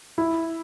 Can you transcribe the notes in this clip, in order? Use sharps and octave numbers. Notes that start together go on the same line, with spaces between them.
E4